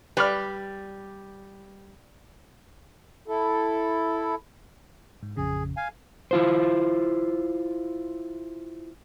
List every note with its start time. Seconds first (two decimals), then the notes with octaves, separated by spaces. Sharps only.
0.17 G3 B4 D5 F6
3.28 E4 A4
5.23 G#2
5.37 A1 F2 C#3 G#4
5.77 F5 G#5
6.31 E4 F4 C5